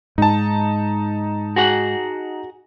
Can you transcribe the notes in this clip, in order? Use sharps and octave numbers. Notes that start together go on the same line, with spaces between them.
G#2 D#4 A5
F#4 G#4 F#5